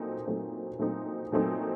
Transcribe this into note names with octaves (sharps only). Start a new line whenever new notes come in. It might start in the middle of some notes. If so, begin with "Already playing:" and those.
Already playing: A#2 F#3 A3 C4 D#4
A#2 F#3 A3 C4 D#4
A#2 F#3 A3 C4 D#4
A#2 F#3 A3 C4 D#4